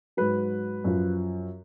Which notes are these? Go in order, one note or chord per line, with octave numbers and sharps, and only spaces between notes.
G#2 F#3 B4
F#2 F3